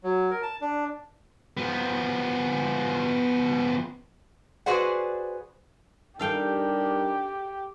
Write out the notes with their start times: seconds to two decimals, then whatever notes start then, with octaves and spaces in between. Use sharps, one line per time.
0.04 F#3
0.31 A#4
0.42 A5
0.61 D4
1.57 F3 B3
4.66 F#4 G#4 B4 C5 D5 F#5
6.19 G3 D4 D#4 G4 A4 A#4 F5 G5